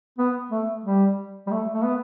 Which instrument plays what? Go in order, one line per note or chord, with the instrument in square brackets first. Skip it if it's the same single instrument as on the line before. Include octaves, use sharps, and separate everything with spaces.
[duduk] B3
A3
G3
G3
A3
A3
B3